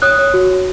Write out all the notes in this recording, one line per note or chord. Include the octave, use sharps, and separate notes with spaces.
C#5 D#6 F#6
C#5
F#4
C#5